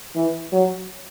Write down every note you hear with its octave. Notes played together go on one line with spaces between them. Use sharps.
E3
F#3